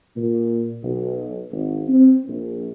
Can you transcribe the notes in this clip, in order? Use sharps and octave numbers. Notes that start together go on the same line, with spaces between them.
A#2
B1
G#1
C4
A#1